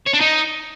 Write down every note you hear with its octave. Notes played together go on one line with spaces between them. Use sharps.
C#5
D4
D#4